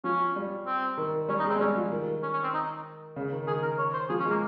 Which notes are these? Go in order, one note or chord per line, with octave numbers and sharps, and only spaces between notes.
F3 C#4
G3
C4
D#3
G3 C#4
D#4
G#3
C4
G#3
G3 C#4
F3
D#3
C#4
C#4
C4
D#4
C#3
D#3
D#3 G#4
A#4
C#5
C5
F3 G#4
C#4
G#3
A#3